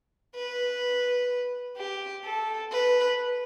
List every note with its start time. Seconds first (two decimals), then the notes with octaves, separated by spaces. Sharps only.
0.35 B4
1.77 G4
2.25 A4
2.72 B4